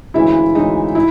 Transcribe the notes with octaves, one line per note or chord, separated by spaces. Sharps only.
D2 C#3 E3 G#3 E4 E5
D2 C#3 E3 G#3 D#4 D#5
E4